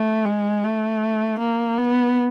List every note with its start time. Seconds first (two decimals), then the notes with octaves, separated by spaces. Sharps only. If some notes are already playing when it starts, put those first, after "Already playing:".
Already playing: A3
0.26 G#3
0.64 A3
1.40 A#3
1.78 B3